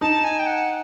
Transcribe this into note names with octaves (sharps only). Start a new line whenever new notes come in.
D#4 A5
G#5
G5
F#5